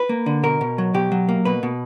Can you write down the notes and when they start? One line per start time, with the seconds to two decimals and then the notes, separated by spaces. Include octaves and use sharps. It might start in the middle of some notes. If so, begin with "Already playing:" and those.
Already playing: B4
0.09 A#3
0.26 D3
0.43 B2 A#4
0.61 B2
0.78 F#3
0.94 B2 G4
1.12 F#3
1.29 A#3
1.45 B2 B4
1.63 B2